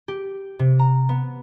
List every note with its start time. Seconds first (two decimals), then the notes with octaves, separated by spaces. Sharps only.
0.08 G4
0.59 C3
0.79 A#5
1.09 B3